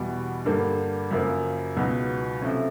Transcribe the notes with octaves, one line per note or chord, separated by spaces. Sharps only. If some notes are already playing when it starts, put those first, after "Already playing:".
Already playing: E2 B2 G3
G2 D3 G3 A#3
F#2 C#3 F3 A#3
C#2 B2 F#3 B3 D#4
C3 F3 A3 C#4